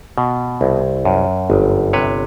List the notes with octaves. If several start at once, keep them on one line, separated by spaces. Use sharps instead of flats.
B2
C2
F#2
G1
C3 B4 C#5